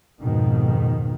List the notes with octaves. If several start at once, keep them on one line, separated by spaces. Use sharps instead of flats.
F2 G#2 B2 D#3